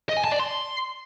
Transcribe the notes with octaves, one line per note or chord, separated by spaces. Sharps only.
D#5
G#5
A5
D5
C6